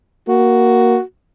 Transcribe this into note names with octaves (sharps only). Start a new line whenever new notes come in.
A#3 F#4